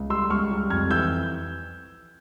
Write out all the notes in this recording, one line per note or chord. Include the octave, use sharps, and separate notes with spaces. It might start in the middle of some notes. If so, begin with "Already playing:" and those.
Already playing: C#2
G3 C6 E6
C#2 C#6 F6
G3
F2 F6 G#6
E3 E6 G6